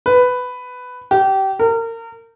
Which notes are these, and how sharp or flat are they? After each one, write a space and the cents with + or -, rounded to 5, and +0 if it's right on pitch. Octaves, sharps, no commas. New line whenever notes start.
B4 +10
G4 -25
A#4 -30